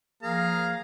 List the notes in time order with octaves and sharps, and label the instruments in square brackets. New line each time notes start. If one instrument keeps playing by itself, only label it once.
[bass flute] F3 [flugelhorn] A#3 [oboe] G#4 [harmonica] F5 A#5